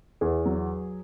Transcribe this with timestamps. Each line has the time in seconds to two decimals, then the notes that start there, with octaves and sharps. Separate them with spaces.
0.21 E2 G#4
0.46 F#3